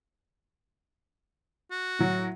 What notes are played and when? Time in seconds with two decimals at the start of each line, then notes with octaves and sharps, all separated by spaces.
1.71 F#4
1.99 A2 F#3